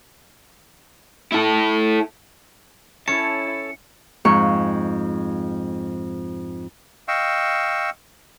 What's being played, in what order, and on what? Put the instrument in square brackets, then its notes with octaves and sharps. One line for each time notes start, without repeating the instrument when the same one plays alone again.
[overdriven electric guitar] E4 A4
[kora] C#4 [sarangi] E4 [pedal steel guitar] A4 C#5 A5 [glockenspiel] C#7
[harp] F2 G#2 C#6
[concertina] D#5 F5 G5 C#6 E6